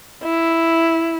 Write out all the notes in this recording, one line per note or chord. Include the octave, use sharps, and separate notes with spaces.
E4